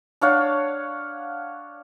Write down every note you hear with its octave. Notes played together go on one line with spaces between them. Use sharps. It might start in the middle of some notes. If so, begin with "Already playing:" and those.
D4 C#5 F5 F#5